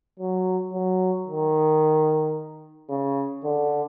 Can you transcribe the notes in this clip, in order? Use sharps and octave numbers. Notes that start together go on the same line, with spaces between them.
F#3
F#3
D#3
C#3
D3